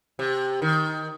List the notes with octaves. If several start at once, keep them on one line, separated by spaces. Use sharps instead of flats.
C3
D#3